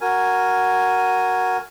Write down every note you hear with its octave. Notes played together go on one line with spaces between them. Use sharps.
F#4 A#4 G#5